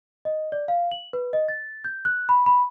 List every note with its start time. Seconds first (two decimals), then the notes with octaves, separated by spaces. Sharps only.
0.25 D#5
0.52 D5
0.68 F5
0.91 F#7
1.13 B4
1.33 D#5
1.48 A6
1.84 G6
2.05 F#6
2.29 B5
2.46 B5